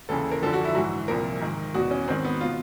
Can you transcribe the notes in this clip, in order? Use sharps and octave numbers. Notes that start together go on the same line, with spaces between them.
D#2 C#3 E3 A4
A#4
F#2 D3 F3 A4
F#4
E4
G#2 E3 F#4
C2 A#2 F3 A#4
G#2 D#3
E2 B2 F#4
C#4
G#2 D#3 C4
B3
B2 F4